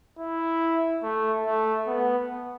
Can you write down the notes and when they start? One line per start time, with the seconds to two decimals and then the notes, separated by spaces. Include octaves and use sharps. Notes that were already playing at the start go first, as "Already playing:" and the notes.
0.19 E4
1.03 A3
1.46 A3
1.87 B3